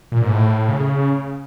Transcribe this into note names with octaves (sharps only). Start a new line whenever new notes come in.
A#2
G#2
A2
C#3